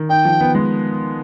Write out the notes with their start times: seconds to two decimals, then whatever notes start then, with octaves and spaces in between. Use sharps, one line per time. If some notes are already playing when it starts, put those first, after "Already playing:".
Already playing: D#3
0.09 D#4 G5
0.25 F3
0.41 B3
0.55 G#3